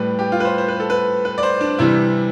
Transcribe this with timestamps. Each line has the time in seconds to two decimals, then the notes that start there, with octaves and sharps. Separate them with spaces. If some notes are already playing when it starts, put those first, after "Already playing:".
Already playing: A2 G3 B4
0.19 G4
0.32 F4
0.40 B4
0.45 C5
0.58 C5
0.68 B4
0.80 A4
0.90 B4
1.25 B4
1.38 D5
1.43 C5
1.61 D4
1.79 C3 E3 G3 E4